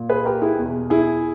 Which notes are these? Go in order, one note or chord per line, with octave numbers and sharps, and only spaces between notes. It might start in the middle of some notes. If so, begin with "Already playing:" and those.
Already playing: A#2
G#4 B4
G4 A#4
E4 G#4
E2 B2
E4 G#4